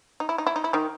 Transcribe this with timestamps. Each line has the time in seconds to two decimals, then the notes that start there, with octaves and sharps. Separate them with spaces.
0.20 D#4
0.29 E4
0.38 D#4
0.47 E4
0.56 D#4
0.64 E4
0.73 D#3 D#4